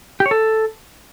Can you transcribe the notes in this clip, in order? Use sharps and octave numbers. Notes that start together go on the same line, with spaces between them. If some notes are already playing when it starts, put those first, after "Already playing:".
G4
C#5
A4